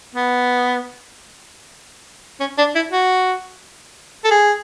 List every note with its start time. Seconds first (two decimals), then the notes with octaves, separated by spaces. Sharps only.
0.15 B3
2.40 C#4
2.58 D4
2.75 E4
2.92 F#4
4.25 A4
4.31 G#4